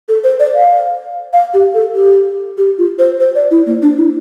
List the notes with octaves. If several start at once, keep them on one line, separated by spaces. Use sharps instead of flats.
A4
C5
D5
F5
F5
G4
A4
G4
G4
F4
C5
C5
D5
E4
A#3
D4
E4